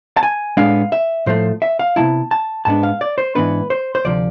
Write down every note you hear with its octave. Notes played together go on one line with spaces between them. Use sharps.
A5
G#5
A2 G#3 B3 D4 F5
E5
A2 F3 A3 C5
E5
F5
C3 F3 B3 E4 A5
A5
G#2 G#3 B3 D4 A5
F5
D5
C5
G#2 E3 B3 D4 B4
C5
C5
D2 C3 F3 D5